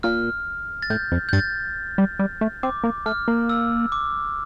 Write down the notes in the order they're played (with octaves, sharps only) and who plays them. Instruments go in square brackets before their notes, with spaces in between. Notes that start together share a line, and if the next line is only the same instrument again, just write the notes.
[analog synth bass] A#2 [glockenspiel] F6
[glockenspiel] A6
[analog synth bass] A2 [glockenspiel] G6
[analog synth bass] F2
[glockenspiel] G6
[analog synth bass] G2 [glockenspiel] A6
[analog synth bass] G3
G3
A3
[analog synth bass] C4 [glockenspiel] D6
[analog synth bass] A#3
[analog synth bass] A3 [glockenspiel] F6
[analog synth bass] A#3
[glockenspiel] E6
D6